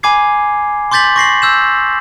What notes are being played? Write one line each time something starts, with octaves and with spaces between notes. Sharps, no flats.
G#5 B5 D6 G#6 C7
C6 D6 G6 A6 B6 F#7
C#6 A#6 C7 F#7
E6 G6 E7